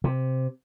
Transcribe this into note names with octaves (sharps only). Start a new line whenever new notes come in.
C3